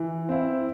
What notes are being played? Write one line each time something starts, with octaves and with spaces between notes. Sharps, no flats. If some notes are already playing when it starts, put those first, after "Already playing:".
Already playing: E3
C4 E4